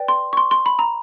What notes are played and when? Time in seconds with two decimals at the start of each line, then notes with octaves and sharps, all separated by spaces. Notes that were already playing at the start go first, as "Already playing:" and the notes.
Already playing: B4 D5 G5
0.08 C6
0.33 C#6
0.37 C6
0.51 C6
0.66 B5
0.79 A#5